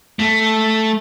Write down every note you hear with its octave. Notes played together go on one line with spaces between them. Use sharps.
A3